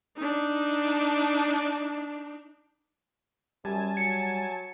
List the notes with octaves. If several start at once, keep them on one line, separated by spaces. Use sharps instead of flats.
D4 D#4
F#2 G3 G#5 A5
F#3 C#7